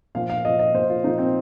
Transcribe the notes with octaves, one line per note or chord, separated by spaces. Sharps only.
A#2 F3 F5
F5
A#2 F3 D#5
D#5
A#2 F3 C5
F4
A#2 F3 D#4
C4